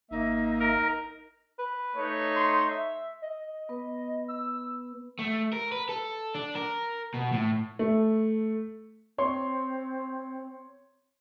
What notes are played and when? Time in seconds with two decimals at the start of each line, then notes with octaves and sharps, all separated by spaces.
0.11 G#1 A#3 D#4 E5
0.60 A#4
1.59 B4
1.96 A3 D#4 C#5
2.36 C6
2.70 E5
3.22 D#5
3.69 B3 B4
4.28 E6
5.19 A3
5.53 A#4
5.72 B4
5.89 A4
6.35 D4
6.55 A#4
7.14 B2
7.32 A2
7.79 A3
9.18 C4 C#5 C6